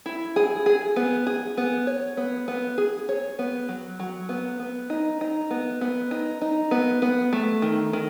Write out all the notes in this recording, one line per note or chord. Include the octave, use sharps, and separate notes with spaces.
E4
G#4
G#4
B3
G#4
B3
C#5
B3
B3
G#4
C#5
B3
F#3
F#3
B3
B3
D#4
D#4
B3
B3
D#4
D#4
B3
B3
A3
D#3
D#3